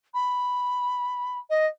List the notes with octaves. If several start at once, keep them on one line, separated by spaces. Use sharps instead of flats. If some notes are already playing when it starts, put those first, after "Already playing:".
B5
D#5